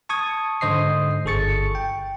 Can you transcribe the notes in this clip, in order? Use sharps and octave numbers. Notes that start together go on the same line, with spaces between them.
A5 C#6 D#6 G#6
G#2 D3 C5 D#5 D#6 C7
G1 G#4 A4 C#6 A6 C#7
G5